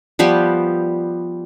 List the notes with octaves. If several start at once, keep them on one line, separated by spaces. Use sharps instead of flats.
F3 G3 B3 G4